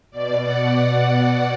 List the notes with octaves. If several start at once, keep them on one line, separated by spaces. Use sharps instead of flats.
B2 D5
F#5
D5